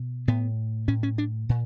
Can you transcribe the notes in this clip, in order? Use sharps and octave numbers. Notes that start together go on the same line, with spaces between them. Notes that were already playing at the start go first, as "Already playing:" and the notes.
Already playing: B2
A2 B3
A2 C#4
C#4
D4
A#2